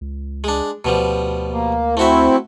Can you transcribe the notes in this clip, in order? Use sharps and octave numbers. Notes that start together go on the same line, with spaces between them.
C#2
G#3 D4
D2 B2 F3 G3
A#3
A3 C4 E4 F#4 E5